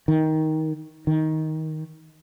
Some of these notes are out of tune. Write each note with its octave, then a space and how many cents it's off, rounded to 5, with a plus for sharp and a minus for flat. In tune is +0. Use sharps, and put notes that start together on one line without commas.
D#3 +15
D#3 +15